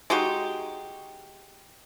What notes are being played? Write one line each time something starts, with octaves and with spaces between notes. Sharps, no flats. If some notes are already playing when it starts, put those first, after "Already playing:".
G#3 D#4 F#4 G4